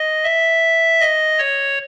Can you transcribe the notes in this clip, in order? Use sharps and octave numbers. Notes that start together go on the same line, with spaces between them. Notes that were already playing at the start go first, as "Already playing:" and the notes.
Already playing: D#5
E5
D#5
C#5